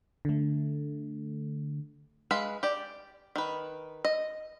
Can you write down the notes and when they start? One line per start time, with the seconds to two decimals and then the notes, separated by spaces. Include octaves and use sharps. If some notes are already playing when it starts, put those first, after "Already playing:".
0.25 D3 A3
2.31 G#3 B4 F5 B5
2.63 G4 D5
3.36 D#3 B4
4.05 D#5